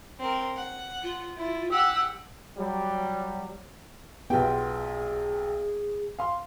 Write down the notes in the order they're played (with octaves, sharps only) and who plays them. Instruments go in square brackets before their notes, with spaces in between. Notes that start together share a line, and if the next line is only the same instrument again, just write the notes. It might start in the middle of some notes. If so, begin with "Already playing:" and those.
[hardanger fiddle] C4 A#4
F#5
[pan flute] F4
[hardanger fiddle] E4
[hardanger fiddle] G4 F#5 [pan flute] E6
[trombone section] F#3 G3
[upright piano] B1 G4 G5 [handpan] B3 F4 [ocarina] G#4
[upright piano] F5 C6